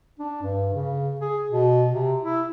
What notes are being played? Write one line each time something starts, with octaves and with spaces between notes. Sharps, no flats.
D4
G2
C#3
G#4
B2
C3
E4